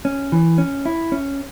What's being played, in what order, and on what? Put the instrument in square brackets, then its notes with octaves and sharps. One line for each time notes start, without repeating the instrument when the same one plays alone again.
[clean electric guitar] C#4
E3
C#4
E4
C#4